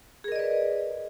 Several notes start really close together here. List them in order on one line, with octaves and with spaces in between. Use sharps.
G#4 A#4 D#5 D5 B4